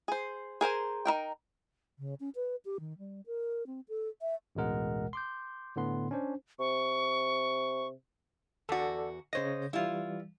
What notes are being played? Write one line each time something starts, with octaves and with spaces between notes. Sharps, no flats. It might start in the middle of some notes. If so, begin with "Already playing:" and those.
G#4 C5
G#4 A#4 C5 G#5
D#4 E4 A#4 G5
C#3
C#4
B4
G4
D#3
G3
A#4
C4
A4
E5
A1 D2 B2 G#3 A#4 F#5
C6 D6 G6
A2 D3 B3 C6
C#4 D4 C5
C3 C#6
E2 F#4 A4 D5
C#3 C5 C#5 D#5 A#6
E3 G3 E4 F4